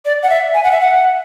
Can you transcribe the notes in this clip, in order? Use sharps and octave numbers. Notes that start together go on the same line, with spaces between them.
D5
F#5
E5
G#5
F#5
E5
F#5